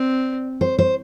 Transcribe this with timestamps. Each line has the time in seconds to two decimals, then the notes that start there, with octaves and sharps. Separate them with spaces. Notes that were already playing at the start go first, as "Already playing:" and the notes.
Already playing: C4 D5
0.61 C5
0.79 C5